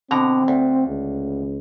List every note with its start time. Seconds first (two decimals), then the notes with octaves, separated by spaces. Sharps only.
0.11 B2 D3 C4 A#5
0.48 D2
0.87 C#2